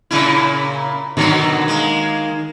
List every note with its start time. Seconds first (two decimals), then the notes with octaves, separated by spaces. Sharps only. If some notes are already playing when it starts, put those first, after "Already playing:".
0.11 A#2 C#3 E4
1.17 B2 D3 D#3 F#3
1.68 G#3 A#3